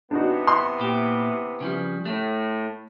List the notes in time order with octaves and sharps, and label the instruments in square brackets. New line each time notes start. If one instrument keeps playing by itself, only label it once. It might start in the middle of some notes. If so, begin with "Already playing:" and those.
[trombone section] C3 E3 B3 [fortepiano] D4 D#4 F#4
[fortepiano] B5 C6 F#6
[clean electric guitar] A#2 G4
C#3 F3 G3
[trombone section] A2 [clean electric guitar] A3